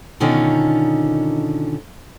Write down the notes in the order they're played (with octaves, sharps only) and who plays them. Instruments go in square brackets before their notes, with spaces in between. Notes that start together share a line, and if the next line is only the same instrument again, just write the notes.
[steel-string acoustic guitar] B2 D3 D#3 C#4 D#4 F4